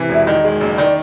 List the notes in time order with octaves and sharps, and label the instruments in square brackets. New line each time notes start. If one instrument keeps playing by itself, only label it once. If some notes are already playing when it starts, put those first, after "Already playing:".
Already playing: [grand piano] C3 E3
[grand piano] E1 [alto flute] E5
[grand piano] D#3 [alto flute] D#5
[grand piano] G#3
F#1
[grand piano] D#3 [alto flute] D5